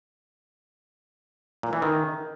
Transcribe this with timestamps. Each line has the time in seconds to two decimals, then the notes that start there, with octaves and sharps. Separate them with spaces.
1.63 A#2
1.73 E3
1.82 D#3